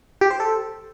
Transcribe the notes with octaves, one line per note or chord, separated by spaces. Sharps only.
G4
C5
A4